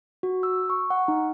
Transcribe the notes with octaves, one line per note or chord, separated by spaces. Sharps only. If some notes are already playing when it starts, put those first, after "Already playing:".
F#4
E6
C#6
F#5
D#4